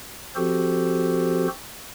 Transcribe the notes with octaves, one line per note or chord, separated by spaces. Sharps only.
F3 C4 F#4 G4 A4 C5